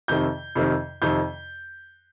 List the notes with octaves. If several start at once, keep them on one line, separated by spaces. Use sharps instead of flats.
F2 C3 D#3 G6
F2 C3 D#3
F2 C3 D#3 G6